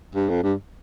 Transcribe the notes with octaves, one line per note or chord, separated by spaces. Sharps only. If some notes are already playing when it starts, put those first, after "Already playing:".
G2
F2
G2